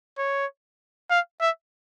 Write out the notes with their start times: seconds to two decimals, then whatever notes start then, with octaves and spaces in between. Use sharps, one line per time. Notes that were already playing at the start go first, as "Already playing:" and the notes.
0.18 C#5
1.10 F5
1.41 E5